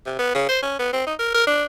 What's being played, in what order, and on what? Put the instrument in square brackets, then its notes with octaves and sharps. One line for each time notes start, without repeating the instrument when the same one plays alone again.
[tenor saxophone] C3
B3
C#3
C5
C#4
B3
C4
D#4
A#4
A#4
D4